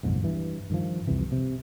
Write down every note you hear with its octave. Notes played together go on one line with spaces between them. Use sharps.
F#1 B1 F2 G#2
G2 E3
G2 D#3 F3
C2 F2 C3 E3
C3